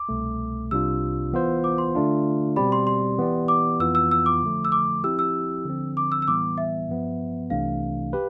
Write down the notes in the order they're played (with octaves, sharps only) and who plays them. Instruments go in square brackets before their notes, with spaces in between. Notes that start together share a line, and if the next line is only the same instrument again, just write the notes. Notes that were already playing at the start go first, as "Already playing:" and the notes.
Already playing: [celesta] D6
[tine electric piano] C2 B2 A3
[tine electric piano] C2 C3 G3 D4 F4 [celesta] E6
[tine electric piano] E3 B3 F4 C5
[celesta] D6
C6
[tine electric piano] D3 A3 D4 F4
[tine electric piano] B2 G3 C4 G4 D5 [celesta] B5
[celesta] C6
C6
[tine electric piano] E3 B3 E4 G4 D5
[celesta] D6
[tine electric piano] F2 E3 B3 F4 [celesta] E6
[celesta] E6
E6
D6
[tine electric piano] D3 F3 A3
[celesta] E6
D6
[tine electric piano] F3 C4 E4 G4 [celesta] E6
[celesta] E6
[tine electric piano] D3 F3 C4
[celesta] D6
E6
E6
[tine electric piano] A2 E3 G3 B3 [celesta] D6
[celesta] E5
[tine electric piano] G2 F3 B3
[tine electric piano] C2 C3 E3 A3 D4 [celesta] F5
[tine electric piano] G4 B4